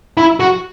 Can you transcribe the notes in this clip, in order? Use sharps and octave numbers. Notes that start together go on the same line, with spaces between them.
E4
F#4